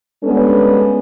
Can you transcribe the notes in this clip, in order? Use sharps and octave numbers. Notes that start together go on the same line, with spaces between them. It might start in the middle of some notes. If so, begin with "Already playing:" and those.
G3 G#3 B3 C#4 D4 A4